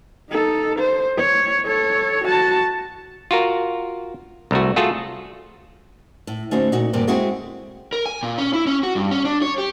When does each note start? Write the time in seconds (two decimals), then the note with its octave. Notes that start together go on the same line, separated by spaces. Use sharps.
0.31 D#4 A4
0.79 C5
1.18 C#5
1.66 A4 C#5
2.24 F#4 A5
3.31 F4 F#4 A#4
4.51 C2 A3 F#4
4.76 A3 F4 F#4 G#4 A4
6.27 A2
6.51 D3 A3 C#4 D#4 F#4 C5
6.72 A#2 D#4 F#4
6.93 E2 G2 C3 A#3 C4
7.07 G#3 C4 E4 F#4 G#4 A4
7.93 A#4
8.06 G#5
8.23 A#2
8.38 C#4
8.53 E4
8.67 C#4
8.83 F#4
8.95 G2
9.11 C#4
9.25 D4
9.42 C#5
9.58 G4